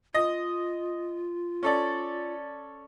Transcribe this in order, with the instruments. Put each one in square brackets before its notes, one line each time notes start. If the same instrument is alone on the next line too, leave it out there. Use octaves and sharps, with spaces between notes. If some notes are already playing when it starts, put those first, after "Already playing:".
[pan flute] F4 [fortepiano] D#5
[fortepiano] C#4 A4 D5